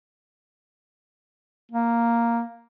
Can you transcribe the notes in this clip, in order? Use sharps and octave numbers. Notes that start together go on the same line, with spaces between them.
A#3